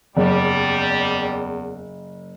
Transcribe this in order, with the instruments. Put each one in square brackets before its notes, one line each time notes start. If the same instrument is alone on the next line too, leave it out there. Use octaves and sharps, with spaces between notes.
[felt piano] F#1 [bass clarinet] E2 [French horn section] G3